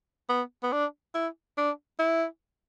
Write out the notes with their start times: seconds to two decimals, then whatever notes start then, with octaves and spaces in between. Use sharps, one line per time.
0.29 B3
0.63 B3
0.72 D4
1.15 E4
1.58 D4
1.99 E4